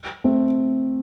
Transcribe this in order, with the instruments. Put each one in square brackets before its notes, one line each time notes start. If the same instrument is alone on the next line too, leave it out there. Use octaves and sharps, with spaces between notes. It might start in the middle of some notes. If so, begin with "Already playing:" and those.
[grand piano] A3 C4